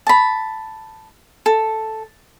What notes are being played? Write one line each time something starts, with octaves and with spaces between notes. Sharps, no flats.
A5 B5
A4